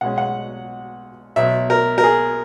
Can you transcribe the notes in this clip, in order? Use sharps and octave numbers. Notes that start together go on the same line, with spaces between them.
B1 B2 G#3 C#4 F#5
F#5
B1 B2 F#3 E5
A#4
A#4
G#4